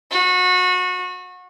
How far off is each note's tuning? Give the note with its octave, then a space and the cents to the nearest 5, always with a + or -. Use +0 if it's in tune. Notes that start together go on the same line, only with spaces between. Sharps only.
F#4 -30